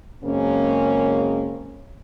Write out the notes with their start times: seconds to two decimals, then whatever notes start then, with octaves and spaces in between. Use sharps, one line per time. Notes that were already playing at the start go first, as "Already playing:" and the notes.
0.25 F#2 C#3 G#3 A#3 C4 C#4